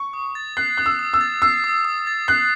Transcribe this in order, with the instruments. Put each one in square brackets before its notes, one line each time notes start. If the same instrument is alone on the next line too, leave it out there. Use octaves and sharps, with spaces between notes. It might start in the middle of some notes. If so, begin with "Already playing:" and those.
Already playing: [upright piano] C#6
[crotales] D#6
A6
[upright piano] F#6 [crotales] C7
[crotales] D#6 [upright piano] F#6
[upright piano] E6
[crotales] D#6
[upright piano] E6
[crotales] A6
[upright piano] E6 [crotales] C7
[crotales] D#6
D#6
A6
[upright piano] F#6 [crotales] C7